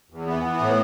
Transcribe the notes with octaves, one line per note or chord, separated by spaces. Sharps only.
E2
E3 B3
E3
A2